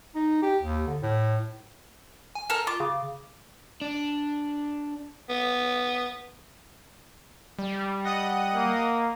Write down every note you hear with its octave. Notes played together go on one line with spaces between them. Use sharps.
D#4
G4
D#2
D3
A2
G#5
A4 A#4
F4 D6
C#3
D4
B3
G3
D#5 F#5 D#6
A#3